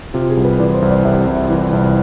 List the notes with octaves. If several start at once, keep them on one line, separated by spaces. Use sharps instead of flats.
C3 F4
G#4
C2
B4
E3 D5
C5
C2
D5
C3 E5
C2
E3
C2